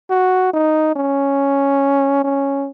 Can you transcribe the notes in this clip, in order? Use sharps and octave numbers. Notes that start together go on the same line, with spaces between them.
F#4
D#4
C#4
C#4